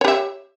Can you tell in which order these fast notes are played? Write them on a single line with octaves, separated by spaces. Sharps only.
C#5 G4 E5